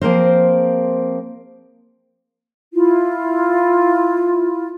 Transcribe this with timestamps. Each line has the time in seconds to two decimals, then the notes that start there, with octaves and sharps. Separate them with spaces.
0.01 F3 A#3 C4 G#4 A#4 C5
2.73 E4 F4